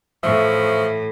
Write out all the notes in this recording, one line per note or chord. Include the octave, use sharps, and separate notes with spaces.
A2 E3 F3 E5 C#6